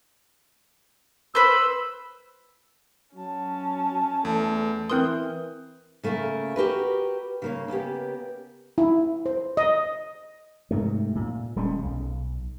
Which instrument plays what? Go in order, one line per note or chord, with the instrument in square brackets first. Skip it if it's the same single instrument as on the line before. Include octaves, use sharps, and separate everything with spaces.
[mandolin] B4 C5 [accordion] E6
[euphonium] F#3 [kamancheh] C#4 A5
[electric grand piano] E2 [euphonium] A3
[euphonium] E3 [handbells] C4 A#4 C6 [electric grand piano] D#6 F#6 G6
[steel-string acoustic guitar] C#3 A3 A#3 A#4
F#4 G4 A#4 B4
C#3 A#3 C#5
C#3 A#3 B3 G4
[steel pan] E4
C5
D#5
[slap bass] G#2 C3 A3
A#2
D#1 G3 G#3 C#4
B1